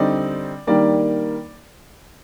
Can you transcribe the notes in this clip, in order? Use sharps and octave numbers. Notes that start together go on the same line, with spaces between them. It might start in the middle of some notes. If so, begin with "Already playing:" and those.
Already playing: D3 G3 C4 D#4 D5
D#3 G3 A#3 D4 D5